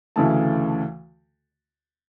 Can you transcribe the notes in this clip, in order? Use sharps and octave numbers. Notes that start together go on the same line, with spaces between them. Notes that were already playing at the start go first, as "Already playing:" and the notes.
D2 C#3 E3 A3 A5